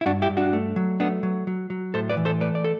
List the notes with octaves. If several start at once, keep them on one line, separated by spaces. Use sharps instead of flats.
E4
G2 D4 F#4
E4 G4
G2
D4 F#4
A3
F#3
A3 B3 D4
F#3
F#3
F#3
A2 A4 C5
B4 D5
E3
A4 C5
A3 B4 D5
D5
A4